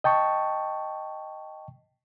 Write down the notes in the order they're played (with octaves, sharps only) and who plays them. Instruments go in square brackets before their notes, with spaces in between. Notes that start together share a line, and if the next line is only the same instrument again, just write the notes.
[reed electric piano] D#5 G5 A5 C#6